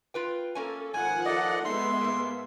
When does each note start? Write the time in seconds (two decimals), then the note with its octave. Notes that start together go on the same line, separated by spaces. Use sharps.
0.14 F4 B4 G5
0.55 A#3 C#4 A4 G#5
0.94 G#2 D#3 F3 F#5 G#5
1.25 A3 G4 A4 D5 D#5
1.65 G#3 B3 D#4 E5 C6
2.01 G#2 A#3